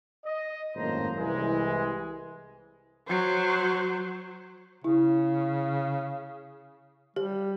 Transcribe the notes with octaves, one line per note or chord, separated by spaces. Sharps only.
D#5
G#1 F#2 A2 A#3 C5 A#5
C2 E3 G#3
F#3 C5
C#3 E4
G3 G4